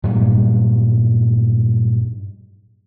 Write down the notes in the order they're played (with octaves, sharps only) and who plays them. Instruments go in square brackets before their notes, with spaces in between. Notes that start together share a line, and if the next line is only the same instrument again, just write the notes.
[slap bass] G2 A#2 F#3 G3